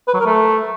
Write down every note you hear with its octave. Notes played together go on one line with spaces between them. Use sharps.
B4
F#3
A#4
A3